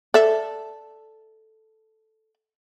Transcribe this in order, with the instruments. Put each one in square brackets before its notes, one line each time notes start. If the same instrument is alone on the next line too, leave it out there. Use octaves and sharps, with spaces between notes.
[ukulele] A4 [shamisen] D5 E5